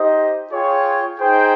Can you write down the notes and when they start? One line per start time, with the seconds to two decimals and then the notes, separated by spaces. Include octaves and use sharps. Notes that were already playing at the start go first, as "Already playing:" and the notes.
Already playing: D#4 G4 C5 D#5
0.49 F4 G#4 C#5 G5
1.19 D#4 G#4 C5 G5